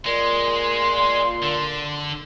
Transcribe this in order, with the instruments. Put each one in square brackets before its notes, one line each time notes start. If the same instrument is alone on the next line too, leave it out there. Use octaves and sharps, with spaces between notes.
[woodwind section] A#2 C6 [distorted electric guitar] G#3
[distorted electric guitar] D3